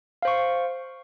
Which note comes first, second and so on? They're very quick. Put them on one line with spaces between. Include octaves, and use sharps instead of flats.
F5 C5 C#6